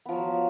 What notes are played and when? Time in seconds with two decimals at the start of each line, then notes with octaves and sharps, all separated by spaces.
0.06 B3
0.09 F3
0.12 F#3